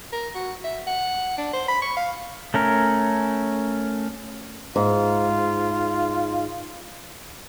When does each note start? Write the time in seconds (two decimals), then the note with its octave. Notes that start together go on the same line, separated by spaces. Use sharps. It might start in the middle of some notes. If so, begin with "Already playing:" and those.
0.13 A#4
0.35 F#4
0.64 E5
0.87 F#5
1.38 D4
1.53 C5
1.68 B5
1.82 C#6
1.97 F5
2.54 A3 C#4 A#4
4.76 G#2 F4